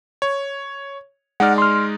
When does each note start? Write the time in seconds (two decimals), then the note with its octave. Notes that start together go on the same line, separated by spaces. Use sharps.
0.22 C#5
1.40 G#3 D#4 D5 F#5 F6
1.58 C6 F6